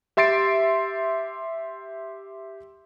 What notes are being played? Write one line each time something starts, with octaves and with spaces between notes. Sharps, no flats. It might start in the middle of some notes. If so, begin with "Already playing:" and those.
G4 E5 C6 A6 C7 D7